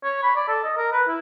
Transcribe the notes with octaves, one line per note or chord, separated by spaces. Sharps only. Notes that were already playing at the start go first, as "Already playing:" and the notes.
C#5
B5
D5
A4
D#5
A#4
B4
E4